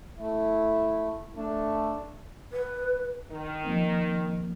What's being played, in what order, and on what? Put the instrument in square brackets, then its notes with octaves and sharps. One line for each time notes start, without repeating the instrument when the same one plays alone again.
[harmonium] A3 [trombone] E4
[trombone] A3 [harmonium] D4
[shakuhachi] B4
[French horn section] D#3
[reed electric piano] F3 A#3 C4